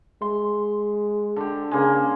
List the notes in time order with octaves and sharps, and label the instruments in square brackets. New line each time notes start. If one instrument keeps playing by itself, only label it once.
[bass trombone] G#3 [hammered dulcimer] C6
[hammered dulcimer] D3 G4
[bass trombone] C#3 [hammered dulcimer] G#3 A#3